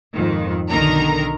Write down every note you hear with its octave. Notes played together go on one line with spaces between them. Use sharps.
F2 G#2 D#3
B1 D3 D#3 A#4 A#5